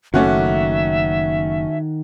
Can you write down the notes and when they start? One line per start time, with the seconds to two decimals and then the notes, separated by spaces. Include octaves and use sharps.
0.14 F#1 D#3 A3 C#4 F#4 E5 F#5 D6